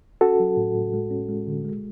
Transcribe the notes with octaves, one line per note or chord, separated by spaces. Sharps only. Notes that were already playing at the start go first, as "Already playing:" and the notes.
C#4 F#4 A4
F#3
A2
A2
G#3
C#4
G#3
D3
G#3